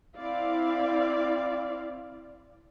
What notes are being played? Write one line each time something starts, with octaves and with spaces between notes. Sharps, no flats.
C4 E4 D5 F5